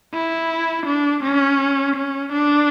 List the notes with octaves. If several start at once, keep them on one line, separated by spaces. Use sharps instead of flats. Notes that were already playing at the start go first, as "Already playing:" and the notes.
E4
D4
C#4
C#4
D4